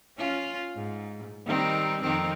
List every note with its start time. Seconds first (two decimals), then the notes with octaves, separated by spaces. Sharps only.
0.18 C#4 F4
0.76 G#2
1.46 D#3 G3 C4
2.02 F2 D#3 C4